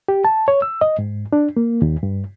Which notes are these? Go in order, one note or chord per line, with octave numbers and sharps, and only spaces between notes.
G4
A5
C#5
E6
D#5
G#2
D4
A#3
D#2
G2